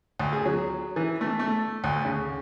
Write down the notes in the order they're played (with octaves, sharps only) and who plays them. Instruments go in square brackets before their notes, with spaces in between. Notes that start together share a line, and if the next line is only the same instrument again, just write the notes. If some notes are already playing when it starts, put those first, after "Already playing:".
[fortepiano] D2
G#4
F#3
E3
A3
A3
D2
C#3